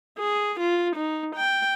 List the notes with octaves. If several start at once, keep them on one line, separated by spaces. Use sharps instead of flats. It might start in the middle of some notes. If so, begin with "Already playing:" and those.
G#4
F4
D#4
G5